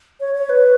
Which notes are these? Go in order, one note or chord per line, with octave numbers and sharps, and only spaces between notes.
C#5
C#5
B4